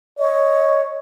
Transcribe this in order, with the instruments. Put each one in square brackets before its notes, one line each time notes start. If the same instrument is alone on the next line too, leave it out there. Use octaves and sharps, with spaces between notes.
[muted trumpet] C#5 [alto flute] D#5